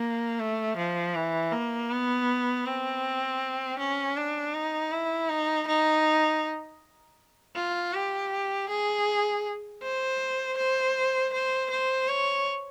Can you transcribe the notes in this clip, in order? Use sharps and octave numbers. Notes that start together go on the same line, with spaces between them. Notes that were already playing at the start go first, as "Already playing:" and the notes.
Already playing: A#3
A3
F3
E3
A#3
B3
C4
C#4
D4
D#4
E4
D#4
D#4
F4
G4
G#4
C5
C5
C5
C5
C#5